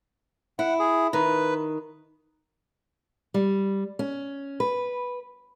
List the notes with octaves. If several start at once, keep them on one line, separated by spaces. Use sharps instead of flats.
E4 F#5
G#4
D#3 B4
G3
C#4
B4